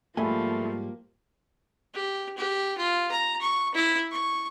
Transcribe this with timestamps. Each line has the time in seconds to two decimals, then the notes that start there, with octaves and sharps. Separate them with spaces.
0.17 G#2 F3 G3 A3 A#3 A4 G#5 B5
1.94 G4
2.37 G4
2.77 F4
3.11 A#5
3.41 C#6
3.74 E4
4.11 C#6